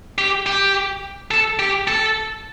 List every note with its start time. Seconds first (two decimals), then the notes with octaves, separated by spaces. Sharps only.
0.18 G4
0.46 G4
1.31 A4
1.59 G4
1.88 A4